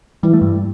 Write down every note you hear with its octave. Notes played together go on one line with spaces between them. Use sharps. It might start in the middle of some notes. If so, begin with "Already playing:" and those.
E3 G3
A3
G2 G3